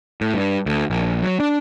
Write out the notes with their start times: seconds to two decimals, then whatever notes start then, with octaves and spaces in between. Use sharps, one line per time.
0.21 A2
0.34 G2
0.66 D2
0.90 A#1
1.23 F#3
1.40 D4